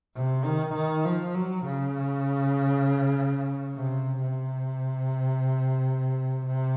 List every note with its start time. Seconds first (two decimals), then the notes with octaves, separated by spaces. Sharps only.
0.15 C3
0.45 D#3
0.75 D#3
1.05 F3
1.35 F#3
1.66 C#3
3.76 C3
4.21 C3
6.47 C3